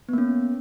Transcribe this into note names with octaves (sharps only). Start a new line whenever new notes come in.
A#3 B3 C#4